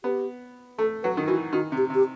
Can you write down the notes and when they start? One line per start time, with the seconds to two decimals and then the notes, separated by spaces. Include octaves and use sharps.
0.04 B3 G4
0.78 A3 A4
1.03 F#3 B4
1.17 D#3
1.28 E3 F#4
1.53 D#3 F#4
1.72 C3
1.77 G4
1.90 C3
1.95 G4